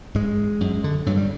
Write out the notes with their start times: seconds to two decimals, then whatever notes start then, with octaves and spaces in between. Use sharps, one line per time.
0.15 G#2 G#3
0.61 F#2
0.84 D3
1.06 G2 F#3
1.17 G3